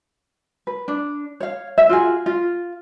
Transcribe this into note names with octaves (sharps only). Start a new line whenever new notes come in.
B4
D4
C#5 F5
E5
F4 F#4 G#4
F4